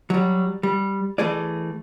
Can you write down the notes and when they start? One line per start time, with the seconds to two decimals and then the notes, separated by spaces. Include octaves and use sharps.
0.10 F#3 G3
0.63 G3
1.18 E3 A3 G#4 D5